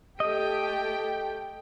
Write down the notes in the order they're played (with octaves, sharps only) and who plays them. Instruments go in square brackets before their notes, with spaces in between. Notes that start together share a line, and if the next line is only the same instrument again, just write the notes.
[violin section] A3 G4 G5 [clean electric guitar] D#5